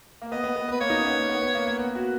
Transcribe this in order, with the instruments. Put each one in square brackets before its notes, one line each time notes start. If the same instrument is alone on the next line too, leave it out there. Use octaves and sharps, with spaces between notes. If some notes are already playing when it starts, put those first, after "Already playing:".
[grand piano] A#3
[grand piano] B3 [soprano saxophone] D#5
[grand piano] B3
B3
[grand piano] B3 [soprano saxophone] B4
[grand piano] A#3 [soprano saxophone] C#5
[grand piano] D#4
C#4
B3
A#3
B3
B3
A#3
A#3
[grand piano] B3 [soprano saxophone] A#4
[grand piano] F#4